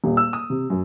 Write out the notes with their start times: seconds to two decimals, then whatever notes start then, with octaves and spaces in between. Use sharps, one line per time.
0.04 D#1
0.17 E6
0.33 D#6
0.50 C3
0.70 F#2